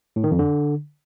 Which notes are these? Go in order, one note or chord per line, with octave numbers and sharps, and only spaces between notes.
A2
D#3
F2
D3